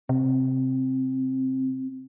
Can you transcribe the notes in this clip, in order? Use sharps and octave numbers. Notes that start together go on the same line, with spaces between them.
C3 C4